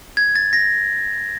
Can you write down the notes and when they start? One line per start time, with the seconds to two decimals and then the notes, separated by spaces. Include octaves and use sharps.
0.17 G#6
0.36 A6
0.53 A#6